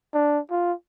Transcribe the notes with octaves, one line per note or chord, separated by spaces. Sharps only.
D4
F4